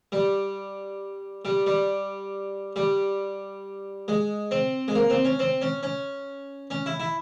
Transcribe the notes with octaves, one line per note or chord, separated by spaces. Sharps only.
G3
G3
G3
G3
G#3
C4
G#3
A#3
C4
C#4
C4
C#4
C#4
C#4
E4
E4